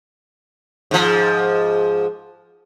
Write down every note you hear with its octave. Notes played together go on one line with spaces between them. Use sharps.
G#2 F3